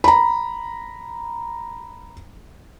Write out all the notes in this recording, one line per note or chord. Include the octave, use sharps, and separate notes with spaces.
A#5 B5